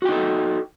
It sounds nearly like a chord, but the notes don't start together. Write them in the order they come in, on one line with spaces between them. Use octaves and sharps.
F#4 G5 D#4 A4